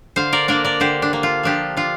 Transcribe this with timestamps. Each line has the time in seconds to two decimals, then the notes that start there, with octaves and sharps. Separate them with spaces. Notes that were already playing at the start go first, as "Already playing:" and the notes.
0.16 D3 C5 F5
0.33 A#4 D5
0.48 A#3 D4 A#4 D5
0.65 A#4 D5
0.80 D3 G4 C5
1.02 D4
1.13 A#3 D4
1.23 F4
1.43 F3 D4 G4
1.76 D4 F4